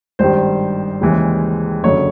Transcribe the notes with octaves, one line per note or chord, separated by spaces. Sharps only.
G#1 G2 D#3 G3 C5
D#2 C#3 E3 G#3
F#1 F#2 D3 C#5